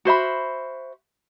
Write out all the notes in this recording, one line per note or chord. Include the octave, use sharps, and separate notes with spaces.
F#4 C5 E5 B5